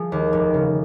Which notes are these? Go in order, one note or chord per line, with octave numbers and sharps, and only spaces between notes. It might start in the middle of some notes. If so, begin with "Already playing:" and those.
Already playing: F3 G#4
D#2
F1
C#3